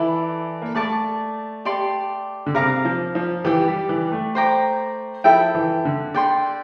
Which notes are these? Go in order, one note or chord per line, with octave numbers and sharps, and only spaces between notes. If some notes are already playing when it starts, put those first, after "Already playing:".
Already playing: E3 E4 A4 D5
A#3
A3 D5 A5 D6
G4 D5 A5 C6
D3
C3 A#4 F5 A#5 D6
F3
F3
E3 G4 D5 G5
G3
E3
A3
C5 G5 A#5 D6
F3 E4 A4 E5 G5
E3
D3
D5 G5 C6